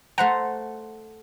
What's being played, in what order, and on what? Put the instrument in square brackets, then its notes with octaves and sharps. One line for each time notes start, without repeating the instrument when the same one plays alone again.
[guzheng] A3 C5 A#5 [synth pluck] F#5